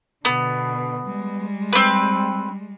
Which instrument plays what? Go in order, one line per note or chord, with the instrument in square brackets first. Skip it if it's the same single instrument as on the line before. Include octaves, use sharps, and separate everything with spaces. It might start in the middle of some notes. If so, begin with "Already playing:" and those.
[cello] B2 D3 [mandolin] B3
[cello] G3 G#3
[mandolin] C4 B4